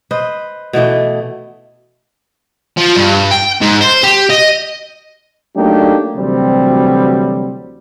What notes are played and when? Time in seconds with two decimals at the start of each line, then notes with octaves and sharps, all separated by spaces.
0.11 B4 C5 D#5
0.73 B2 E3 A3 D#5
2.77 F3
2.96 G2
3.31 G5
3.61 G#2
3.81 C5
4.03 G4
4.30 D#5
5.56 F#3 A3 A#3 D4 D#4 G4
6.16 D2 C3 E3 F#3 G3 C4